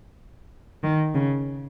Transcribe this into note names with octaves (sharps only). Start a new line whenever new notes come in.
D#3
C#3